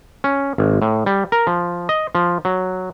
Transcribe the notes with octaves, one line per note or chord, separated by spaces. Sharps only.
C#4
G#1
A2
G3
A#4
F3
D#5
F3
F#3